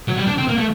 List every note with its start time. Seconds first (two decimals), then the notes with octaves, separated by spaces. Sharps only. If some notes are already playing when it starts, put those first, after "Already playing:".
0.08 F#3
0.17 G3
0.27 D4
0.38 C4
0.48 A#3
0.58 A3